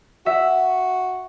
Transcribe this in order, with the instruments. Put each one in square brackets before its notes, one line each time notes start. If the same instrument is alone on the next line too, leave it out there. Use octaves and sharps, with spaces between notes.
[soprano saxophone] F#4 [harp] E5